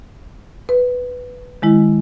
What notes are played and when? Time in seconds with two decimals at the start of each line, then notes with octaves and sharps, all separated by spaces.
0.69 B4
1.62 D#3 G#3 E4